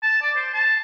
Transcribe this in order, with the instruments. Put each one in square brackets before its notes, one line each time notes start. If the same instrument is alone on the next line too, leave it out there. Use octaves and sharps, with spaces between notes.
[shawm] A5
D5
C5
A5